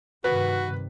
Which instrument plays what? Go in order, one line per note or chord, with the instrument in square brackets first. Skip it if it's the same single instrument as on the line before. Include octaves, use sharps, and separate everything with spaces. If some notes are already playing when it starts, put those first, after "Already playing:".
[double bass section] G2 C3 D#3 [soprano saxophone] F#4 [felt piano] B4